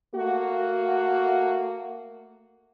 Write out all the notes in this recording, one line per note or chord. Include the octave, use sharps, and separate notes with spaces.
A3 A#3 F#4